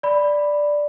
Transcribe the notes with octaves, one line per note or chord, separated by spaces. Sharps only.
D5 B5